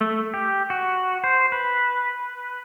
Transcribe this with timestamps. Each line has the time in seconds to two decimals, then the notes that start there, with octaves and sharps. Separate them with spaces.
0.01 A3
0.34 G4
0.70 F#4
1.24 C5
1.52 B4